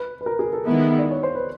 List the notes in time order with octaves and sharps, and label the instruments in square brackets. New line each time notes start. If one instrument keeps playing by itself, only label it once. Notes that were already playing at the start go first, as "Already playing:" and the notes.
Already playing: [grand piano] B4
B4
A#4
G#4
A4
[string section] D#3 G#3 B3 E4
[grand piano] D5
C#5
C5
B4